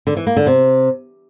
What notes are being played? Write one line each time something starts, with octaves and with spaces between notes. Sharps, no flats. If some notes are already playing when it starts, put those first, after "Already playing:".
D3
E3
A#3
D3
C3